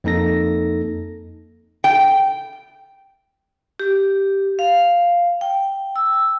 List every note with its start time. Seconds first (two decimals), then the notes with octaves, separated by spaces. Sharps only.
0.04 F2 A#3 D#4 A4 A#6
1.84 G5
3.80 G4
4.59 F5
5.41 G5
5.96 E6